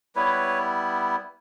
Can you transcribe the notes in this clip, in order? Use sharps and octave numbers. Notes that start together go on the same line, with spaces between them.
G3 B3 E4 B4 C#5